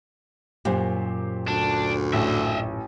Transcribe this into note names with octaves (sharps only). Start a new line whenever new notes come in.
F#2 A#2 G4 C5
D2 D4
A1 D#5 E5